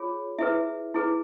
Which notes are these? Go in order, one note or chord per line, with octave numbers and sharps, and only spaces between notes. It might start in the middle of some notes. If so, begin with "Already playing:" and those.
Already playing: F4 G#4 C#5
E4 G#4 B4 E5
E4 G#4 B4